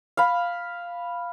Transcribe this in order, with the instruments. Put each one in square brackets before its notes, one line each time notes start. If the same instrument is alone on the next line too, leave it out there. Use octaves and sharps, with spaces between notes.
[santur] F5 B5